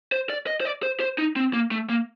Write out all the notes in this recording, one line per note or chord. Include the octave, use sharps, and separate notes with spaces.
C5
D5
D#5
C5
D5
C5
C5
D#4
C4
A#3
A3
A#3